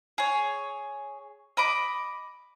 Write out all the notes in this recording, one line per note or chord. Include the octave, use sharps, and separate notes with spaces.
G#4 C#5
D#5 B5 D6